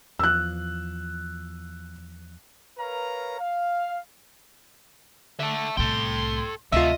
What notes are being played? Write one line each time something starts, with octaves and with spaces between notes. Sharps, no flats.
E2 F3 E6 F#6
A#4 B4 C#5 F5 A#5
F5
D3 E5 A5
C2 A2 A4 G5 C6
D2 C3 A3 F4 D#5 E5